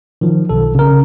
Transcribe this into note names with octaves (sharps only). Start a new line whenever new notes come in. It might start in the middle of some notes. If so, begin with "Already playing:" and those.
D#3 F3
B1 A4
C#3 A#4